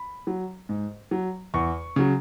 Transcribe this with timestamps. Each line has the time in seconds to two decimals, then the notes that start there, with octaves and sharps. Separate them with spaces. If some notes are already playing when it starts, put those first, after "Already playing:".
Already playing: B5
0.27 F#3
0.69 G#2
1.11 F#3
1.54 E2 C#6
1.96 C#3 F#3